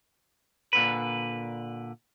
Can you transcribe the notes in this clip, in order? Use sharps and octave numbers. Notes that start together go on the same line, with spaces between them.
A#2 D3 B4